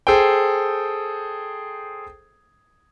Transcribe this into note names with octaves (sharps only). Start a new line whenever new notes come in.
G#4 A4 C5 G5